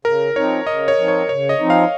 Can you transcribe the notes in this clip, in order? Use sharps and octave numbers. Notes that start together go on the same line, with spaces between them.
C#3 A#4
F3 C4 D#4 C#5
C#3 D#5
C#5
F3 C4 D#4
C#5
C#3 C#5
D#5
F3 C4 D#4
F5